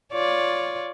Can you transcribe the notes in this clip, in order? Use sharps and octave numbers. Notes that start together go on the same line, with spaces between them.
F4 C#5 D5